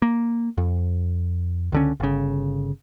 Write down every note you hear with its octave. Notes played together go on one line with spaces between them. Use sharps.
A#3
F2
C#2 D3 C#4
G1 C#3